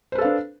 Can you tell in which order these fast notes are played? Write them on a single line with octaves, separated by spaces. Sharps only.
C5 B4 A4 F5 D4